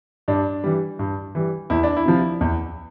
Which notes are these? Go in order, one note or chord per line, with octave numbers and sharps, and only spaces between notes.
G2 D4
E3 G3
G2
E3 G3
E2 E4
D4
E4
C3 F3
E2